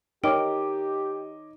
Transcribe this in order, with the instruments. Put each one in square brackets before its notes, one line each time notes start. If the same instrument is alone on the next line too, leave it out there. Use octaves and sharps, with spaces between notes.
[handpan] D#4 [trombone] G4 [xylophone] A#4 G5 [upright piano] C#5 D#5 D6